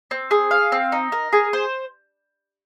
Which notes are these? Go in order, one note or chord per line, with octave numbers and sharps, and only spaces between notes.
C4
G#4
F5
C4
D#4
A#4
G#4
C5